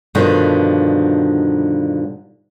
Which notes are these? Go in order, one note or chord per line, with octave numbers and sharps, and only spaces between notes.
G2 B2 D3 D#3 F3 G3